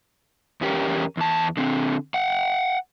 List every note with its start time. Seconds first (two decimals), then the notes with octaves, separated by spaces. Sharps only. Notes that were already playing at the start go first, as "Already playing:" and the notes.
0.61 E2 C#4 G4 A#4
1.17 E2 A5
1.57 D3 C4
2.14 F#5 G5